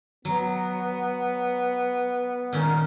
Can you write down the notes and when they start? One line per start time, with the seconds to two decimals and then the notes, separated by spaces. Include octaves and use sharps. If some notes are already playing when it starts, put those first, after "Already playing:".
0.25 F#3 B3
2.53 A#2 D#3 C#4